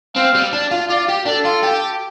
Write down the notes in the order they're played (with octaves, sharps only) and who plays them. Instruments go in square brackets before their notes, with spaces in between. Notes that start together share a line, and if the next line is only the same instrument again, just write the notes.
[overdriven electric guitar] C4 [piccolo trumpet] F5
[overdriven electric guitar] G3
D4
F4
[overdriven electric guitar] F4 [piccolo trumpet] D5
[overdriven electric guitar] G4
[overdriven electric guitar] D4 [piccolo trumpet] A4
[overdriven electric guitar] F4
G4